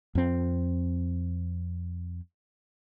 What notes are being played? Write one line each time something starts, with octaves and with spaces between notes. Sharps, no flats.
F2 C4